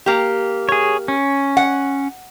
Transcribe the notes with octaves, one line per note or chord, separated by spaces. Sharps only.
A#3 G4
G#4 C#5
C#4
F#5